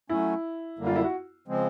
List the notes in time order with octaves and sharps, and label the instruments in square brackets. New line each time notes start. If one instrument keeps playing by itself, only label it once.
[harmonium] F#3 A3 C#4 [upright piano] E4
[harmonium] F#2 D3 G3 A#3
[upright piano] F4
E4
F#4
[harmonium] C#3 F3 G#3 C4